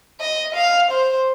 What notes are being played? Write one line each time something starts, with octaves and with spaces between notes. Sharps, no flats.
D#5
F5
C5